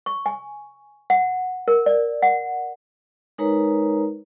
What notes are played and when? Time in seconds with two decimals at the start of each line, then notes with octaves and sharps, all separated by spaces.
0.06 C#6
0.26 G#5
1.10 F#5
1.68 A#4
1.86 D5
2.23 F#5
3.38 G#3 D#4 A#4 B4 C#5 A#5